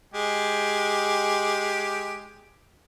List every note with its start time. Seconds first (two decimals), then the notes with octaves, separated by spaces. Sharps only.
0.14 G#3 G4